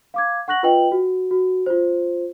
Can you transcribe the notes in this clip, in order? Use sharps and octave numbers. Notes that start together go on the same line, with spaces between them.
F5 D6 G#6
F#5 C#6 F#6 A#6 F#7
F4 B4 D#5 G5 F#7
F#4
F#4
F4 C5